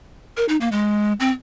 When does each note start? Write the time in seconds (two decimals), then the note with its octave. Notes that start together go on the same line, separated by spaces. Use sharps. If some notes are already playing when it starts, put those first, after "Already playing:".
0.37 A#4
0.49 D#4
0.61 A#3
0.72 G#3
1.20 C4